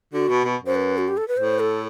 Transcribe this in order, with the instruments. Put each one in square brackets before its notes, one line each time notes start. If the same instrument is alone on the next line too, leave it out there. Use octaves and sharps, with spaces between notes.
[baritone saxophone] D3 [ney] F#4
[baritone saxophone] B2
B2
F#2
[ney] C5
B4
F#4
G4
A4
B4
[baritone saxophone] A2 [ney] C5
[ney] A4